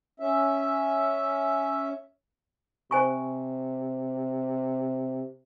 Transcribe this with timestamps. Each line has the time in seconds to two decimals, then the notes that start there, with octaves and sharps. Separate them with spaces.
0.20 C#4 E5
2.91 C3 C5 G#5 C#6